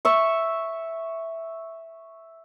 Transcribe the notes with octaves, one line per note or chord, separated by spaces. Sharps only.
E5 C#6